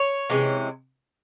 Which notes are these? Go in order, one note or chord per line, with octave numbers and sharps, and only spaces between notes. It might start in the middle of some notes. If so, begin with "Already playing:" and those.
Already playing: C#5
C3 E3 G#3 C#4